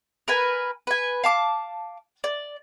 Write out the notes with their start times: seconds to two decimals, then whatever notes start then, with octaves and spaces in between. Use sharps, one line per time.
0.28 A#4 B4 G#5
0.87 B4 G#5
1.24 F5 A5 D6
2.24 D5